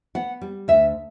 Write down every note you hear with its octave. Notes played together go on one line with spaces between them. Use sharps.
B3 F#5
G3
D2 E5